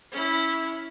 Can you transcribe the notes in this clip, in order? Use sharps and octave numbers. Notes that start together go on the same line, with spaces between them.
C#4 E4